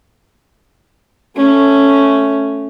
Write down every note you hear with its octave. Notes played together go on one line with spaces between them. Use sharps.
A3 C#4